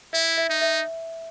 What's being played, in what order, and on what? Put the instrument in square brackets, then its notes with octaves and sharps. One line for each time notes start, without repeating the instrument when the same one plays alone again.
[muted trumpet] E4 [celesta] E5
[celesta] E5
[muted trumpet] D#4
[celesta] E5